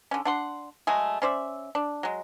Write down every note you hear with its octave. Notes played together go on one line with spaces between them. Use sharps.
D3 C#4
D4 F#5 C6
F#3 G#3 A3 G#4
C#4 C5 D5 E5
D4
F#3 G#3